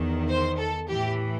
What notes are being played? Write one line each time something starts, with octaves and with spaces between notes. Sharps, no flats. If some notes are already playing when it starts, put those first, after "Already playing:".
Already playing: E2 D#3
C5
A4
A2 E3 G4